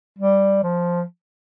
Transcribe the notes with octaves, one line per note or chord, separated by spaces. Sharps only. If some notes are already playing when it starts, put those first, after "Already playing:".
G3
F3